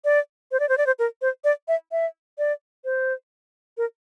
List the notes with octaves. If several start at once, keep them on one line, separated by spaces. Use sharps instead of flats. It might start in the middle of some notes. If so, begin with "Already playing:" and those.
D5
C5
D5
C5
D5
C5
A#4
C5
D5
E5
E5
D5
C5
A#4